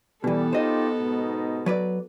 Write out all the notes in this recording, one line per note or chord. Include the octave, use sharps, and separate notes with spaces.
B2 E3 G3 B3 A4
D#4 F4 G4 C5 D#5
G#2 B2 D#4
F#3 B4 D5